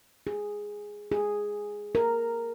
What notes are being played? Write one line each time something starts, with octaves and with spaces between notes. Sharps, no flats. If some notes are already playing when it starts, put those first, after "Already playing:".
G#4
G#4
A#4